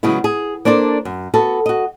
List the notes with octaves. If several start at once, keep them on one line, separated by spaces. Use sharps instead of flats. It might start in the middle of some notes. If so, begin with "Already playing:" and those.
C#3 F#3 G#3 B3 E4
G#4
A#3 D4 A4 C5 D5
F#2
B3 F#4 A4
F#4 D#5